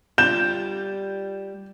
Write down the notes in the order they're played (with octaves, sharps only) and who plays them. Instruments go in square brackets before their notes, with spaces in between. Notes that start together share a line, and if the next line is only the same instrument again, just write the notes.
[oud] G3 F4 [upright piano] G6 E7